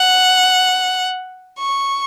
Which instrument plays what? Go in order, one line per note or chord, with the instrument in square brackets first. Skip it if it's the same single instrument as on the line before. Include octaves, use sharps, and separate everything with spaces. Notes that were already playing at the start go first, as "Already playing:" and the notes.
Already playing: [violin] F#5
C#6